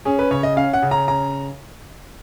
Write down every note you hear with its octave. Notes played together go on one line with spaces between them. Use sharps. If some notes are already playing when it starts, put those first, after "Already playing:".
C#4 G#4
B4
C#3 C#5
D#5
C#4 F5
F#5
C#3
A#5
A#5